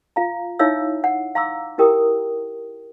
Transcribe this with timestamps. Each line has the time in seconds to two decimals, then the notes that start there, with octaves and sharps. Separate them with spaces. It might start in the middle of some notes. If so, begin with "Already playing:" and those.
0.16 F4 F5 A#5
0.59 D#4 E4 C#5 E5 F5 E6
1.04 F#5
1.35 F5 A#5 C6 D6 E6
1.78 E4 G4 A#4 G5 D#6